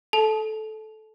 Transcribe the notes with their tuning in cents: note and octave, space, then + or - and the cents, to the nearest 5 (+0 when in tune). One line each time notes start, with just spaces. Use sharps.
A4 -15 A5 -30